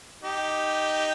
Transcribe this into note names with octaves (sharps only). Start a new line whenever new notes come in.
D#4 G4